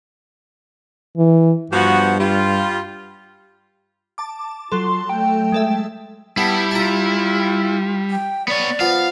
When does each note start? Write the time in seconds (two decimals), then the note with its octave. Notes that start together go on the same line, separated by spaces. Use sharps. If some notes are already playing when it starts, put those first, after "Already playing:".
1.17 E3
1.72 G2 F3 B3 F#4
2.20 G3 F4
4.18 A5 D6
4.72 F#3 F4 A4 C6
5.09 A3 G5
5.52 G#3 A4 E5
6.37 G3 B3 E4 A5
6.71 F4 A5 A#5
8.11 G5
8.48 B3 C#5 D5
8.80 F3 B3 F5